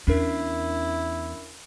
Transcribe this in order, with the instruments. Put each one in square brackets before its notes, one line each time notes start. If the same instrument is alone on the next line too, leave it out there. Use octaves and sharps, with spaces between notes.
[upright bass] E2 [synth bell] C#4 D4 A#4 [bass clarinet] E4